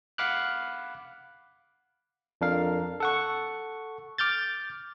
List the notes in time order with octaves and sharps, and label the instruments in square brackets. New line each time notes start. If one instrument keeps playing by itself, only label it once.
[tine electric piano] F5 F#5 B5 D6 F6 F#6
F2 D4 A#4 F5
A4 F#5 C#6
D6 F6 G6 A6